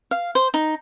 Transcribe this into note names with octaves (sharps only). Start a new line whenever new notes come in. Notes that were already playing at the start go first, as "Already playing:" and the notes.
F5
C5
D#4